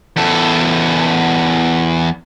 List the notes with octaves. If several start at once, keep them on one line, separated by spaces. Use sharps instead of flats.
E2 A4